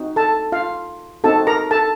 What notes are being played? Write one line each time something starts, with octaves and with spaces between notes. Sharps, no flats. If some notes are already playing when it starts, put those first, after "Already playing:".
Already playing: C4 D#4 F#4
A4 A5
F4 F5
C4 D#4 F#4 A4 A5
A#4 A#5
A4 A5